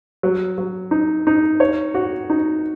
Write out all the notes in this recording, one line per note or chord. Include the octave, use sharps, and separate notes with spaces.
F#3
F#3
D#4
D#4
C#5
F#4
D#4